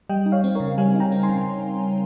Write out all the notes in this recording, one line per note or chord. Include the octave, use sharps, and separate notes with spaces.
G3 D#5 G5
D#4
C#5 F5
C4
A#4 C#5
C#3
G3 F5 G#5
D#4 G5 A#5
C4
G#5 C6
C#3